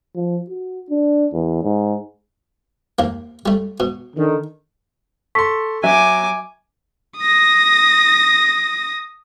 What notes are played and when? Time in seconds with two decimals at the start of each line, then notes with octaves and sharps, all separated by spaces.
0.15 F3
0.50 F#4
0.90 D4
1.33 E2
1.63 G#2
2.99 D#2 A#3
3.46 G3 A3
3.80 B2
4.17 D3 D#3
5.35 A4 C6 C#6 B6
5.83 F#3 E5 G#5 D6
7.18 D#6 A#6